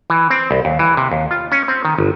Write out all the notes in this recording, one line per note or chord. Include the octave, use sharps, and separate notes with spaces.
E3
C4
C2
D#2
E3
C3
D#2
F4
C#4
C4
D#3
G1